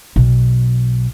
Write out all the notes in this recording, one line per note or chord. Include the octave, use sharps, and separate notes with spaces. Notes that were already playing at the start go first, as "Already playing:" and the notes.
B1